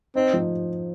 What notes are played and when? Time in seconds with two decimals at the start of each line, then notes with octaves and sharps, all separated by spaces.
0.15 C4 D#4
0.33 F3